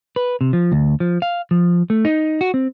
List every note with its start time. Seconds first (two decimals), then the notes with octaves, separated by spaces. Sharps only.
0.16 B4
0.41 C3
0.53 F3
0.72 D2
1.00 F3
1.22 F5
1.51 F3
1.90 A3
2.05 D#4
2.41 F#4
2.54 C4